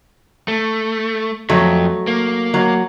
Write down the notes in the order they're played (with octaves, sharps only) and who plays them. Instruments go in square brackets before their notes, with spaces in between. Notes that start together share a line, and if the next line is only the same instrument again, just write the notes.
[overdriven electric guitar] A3
[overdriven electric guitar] F2 [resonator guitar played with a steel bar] F#3 A3
[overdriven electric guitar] A#3
[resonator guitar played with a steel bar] F#3